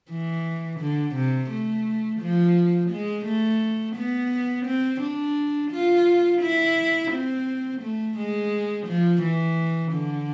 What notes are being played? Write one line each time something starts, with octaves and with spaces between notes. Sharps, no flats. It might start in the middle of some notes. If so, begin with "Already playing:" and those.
E3
D3
C3
A3
F3
G#3
A3
B3
C4
D4
F4
E4
C4
A3
G#3
F3
E3
D3